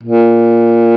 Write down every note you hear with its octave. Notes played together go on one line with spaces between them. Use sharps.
A#2